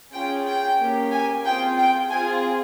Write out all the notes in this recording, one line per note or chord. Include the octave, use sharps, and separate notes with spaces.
C#4 F4 G#4 G5
G5
A#3 C#4 G4
G#5
C4 F4 G#4 G5
G5
C4 F4 G#4 G#5